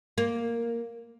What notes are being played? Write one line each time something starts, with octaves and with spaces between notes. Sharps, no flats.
A#3